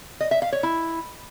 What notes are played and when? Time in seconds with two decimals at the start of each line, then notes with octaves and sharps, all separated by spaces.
0.21 D#5
0.31 E5
0.42 F5
0.53 C#5
0.63 E4